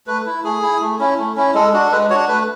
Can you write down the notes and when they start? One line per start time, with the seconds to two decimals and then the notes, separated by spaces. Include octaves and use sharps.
0.07 A3 B4
0.26 E4
0.44 A3 G#4
0.62 E4
0.81 A3
0.99 C#4 E4
1.18 A3
1.36 C#4 E4
1.54 G#3 A4
1.73 D4 F#4
1.86 A4
1.91 G#3 B4
2.10 D4 F#4 C#5
2.28 A3 B4